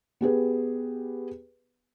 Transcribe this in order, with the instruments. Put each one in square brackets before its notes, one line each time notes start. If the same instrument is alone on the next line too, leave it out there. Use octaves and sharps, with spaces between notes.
[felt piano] B3 G4 G#4 B4